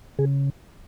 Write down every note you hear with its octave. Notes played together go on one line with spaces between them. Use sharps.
C#3 G#4